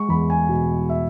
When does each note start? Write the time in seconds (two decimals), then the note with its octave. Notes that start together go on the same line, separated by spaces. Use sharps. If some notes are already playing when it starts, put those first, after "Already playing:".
Already playing: G#3 C#6
0.09 E2 B5
0.30 G#5
0.49 B2
0.89 E5